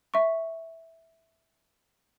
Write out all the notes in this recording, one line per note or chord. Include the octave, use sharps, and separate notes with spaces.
E5 C#6